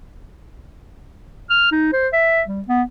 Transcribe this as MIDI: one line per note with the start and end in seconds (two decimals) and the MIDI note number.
1.50 1.72 89
1.72 1.89 63
1.93 2.08 72
2.13 2.42 76
2.48 2.61 55
2.68 2.83 59